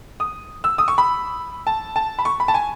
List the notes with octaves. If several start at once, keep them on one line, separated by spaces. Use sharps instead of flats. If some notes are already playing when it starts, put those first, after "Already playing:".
D#6
E6
D#6
C#6
B5
A5
A5
B5
C#6
B5
A5
G#5